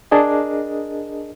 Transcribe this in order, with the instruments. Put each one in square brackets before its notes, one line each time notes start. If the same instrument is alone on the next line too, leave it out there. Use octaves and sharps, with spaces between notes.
[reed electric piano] D4 G#4 A#4 D#5